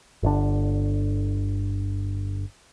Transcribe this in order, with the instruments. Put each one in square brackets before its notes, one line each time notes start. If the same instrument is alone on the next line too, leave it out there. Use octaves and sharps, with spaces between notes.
[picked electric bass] G1 D3